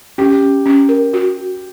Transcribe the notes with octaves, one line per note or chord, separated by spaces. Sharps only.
C#4 G4
C#4
C#4
A#4
F#4
F#4